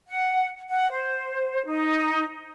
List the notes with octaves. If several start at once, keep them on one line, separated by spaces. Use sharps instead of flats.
F#5
F#5
C5
D#4